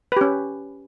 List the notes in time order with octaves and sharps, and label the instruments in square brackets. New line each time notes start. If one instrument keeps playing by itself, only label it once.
[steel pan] B4
G4
C#4